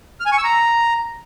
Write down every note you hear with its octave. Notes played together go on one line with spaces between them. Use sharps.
F6
G#5
C#6
E6
A#5